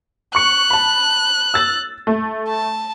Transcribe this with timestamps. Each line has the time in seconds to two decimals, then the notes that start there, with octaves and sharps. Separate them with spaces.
0.35 C#6 F#6 C#7
0.70 A5 B5
1.54 E6 A6
2.07 A3
2.49 A5